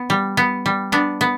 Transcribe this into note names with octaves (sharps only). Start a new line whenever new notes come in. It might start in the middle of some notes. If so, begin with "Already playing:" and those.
Already playing: B3
G3
B3
G3
B3 D4
B3